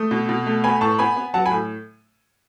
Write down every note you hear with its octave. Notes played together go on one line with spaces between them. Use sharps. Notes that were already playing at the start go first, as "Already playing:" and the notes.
Already playing: A3 D#6
B2
B2
A3
B3 G#5 B5
A2 A5 C#6
B3 G#5 B5
B3
F#3 F#5 A5
G#5 B5
A2